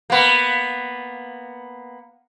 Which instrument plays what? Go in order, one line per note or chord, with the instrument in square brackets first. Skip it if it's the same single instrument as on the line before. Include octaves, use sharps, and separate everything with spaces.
[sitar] A#3 B3